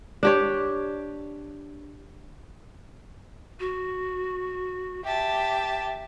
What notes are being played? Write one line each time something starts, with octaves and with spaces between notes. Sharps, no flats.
D4 G4 C#5
F#4
G4 E5 A5